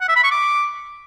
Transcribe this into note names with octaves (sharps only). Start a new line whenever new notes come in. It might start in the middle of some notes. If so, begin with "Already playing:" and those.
F#5
E5
B5
C#6
D6